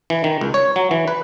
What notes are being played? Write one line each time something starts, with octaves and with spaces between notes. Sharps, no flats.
E3
D#3
C#2
C#5
F#3
E3
B4